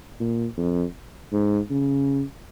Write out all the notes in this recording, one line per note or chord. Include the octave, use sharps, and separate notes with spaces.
A#2
F2
G#2
C#3